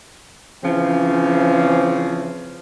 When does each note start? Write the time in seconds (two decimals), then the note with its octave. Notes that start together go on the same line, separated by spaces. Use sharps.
0.63 C#3 E3 F3 C4 C#4